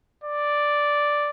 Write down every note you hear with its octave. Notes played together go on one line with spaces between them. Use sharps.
D5